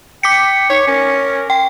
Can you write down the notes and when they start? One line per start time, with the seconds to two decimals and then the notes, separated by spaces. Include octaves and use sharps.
0.23 G5 D6 B6 C#7
0.70 D#4 C#5
0.87 C#4 A#4
1.50 G5 C6